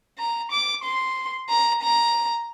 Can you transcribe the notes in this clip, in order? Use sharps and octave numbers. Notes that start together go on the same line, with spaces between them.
A#5
D6
C6
A#5
A#5